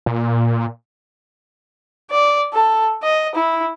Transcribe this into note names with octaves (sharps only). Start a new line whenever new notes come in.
A#2
D5
A4
D#5
E4